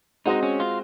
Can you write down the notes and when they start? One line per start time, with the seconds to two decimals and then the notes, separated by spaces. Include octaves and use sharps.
0.26 G#3 C4 D#4 F#4 C5 D#5
0.43 C#4
0.60 F4